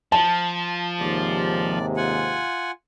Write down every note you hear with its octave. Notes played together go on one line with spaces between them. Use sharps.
F3 A5
D#2 G#2 C3 D5
F4 F#5 G#5